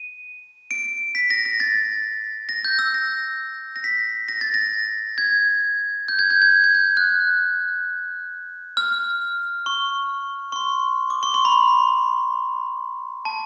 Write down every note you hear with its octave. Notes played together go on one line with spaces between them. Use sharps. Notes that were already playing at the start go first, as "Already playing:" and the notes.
Already playing: D#7
D7
B6
A#6
A#6
A6
A#6
G6
E6
A#6
A#6
B6
A#6
A6
A#6
G#6
G6
G#6
G6
G#6
G6
G#6
G6
F#6
F6
C#6
C#6
C6
D6
C#6
C6
B5
A5